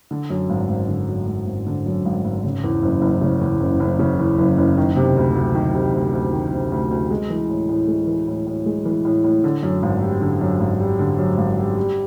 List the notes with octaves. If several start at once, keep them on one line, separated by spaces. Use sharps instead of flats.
D3
F#2
G#1
G#1
D3
F#2
G#1
G#1
D3
F#2
G#1
G#1
C#3
E2
F#1
F#1
C#3
E2
F#1
F#1
C#3
E2
F#1
F#1
D#3
C3
D2
D2
D#3
C3
D2
D2
D#3
C3
D2
D2
G#3
E3
A2
A2
G#3
E3
A2
A2
G#3
E3
A2
A2
D3
F#2
G#1
G3
D3
F#2
G#1
G3
D3
F#2
G#1
G3
G3